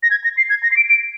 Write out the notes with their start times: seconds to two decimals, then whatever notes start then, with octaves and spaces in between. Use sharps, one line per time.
0.03 A#6
0.11 G#6
0.24 A#6
0.37 C7
0.50 G#6
0.63 A#6
0.71 C7
0.77 D7
0.89 D7